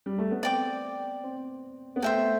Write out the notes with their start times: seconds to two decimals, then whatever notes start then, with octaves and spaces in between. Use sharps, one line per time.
0.06 G3
0.18 A3
0.31 B3
0.43 C4 D5 G5 D6
1.23 C4
1.96 B3
2.02 A3 C5 E5 G5